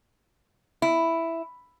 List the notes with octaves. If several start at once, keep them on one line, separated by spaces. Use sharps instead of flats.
E4